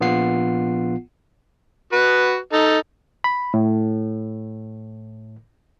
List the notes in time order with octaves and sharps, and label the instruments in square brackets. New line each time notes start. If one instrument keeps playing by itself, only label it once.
[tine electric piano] A#1 B3 F4 F#5 C7
[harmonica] F#4 B4
D#4 A4
[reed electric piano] B5
A2